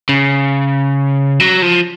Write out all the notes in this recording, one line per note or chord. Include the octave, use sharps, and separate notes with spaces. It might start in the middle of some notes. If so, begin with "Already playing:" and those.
C#3
F#3
F3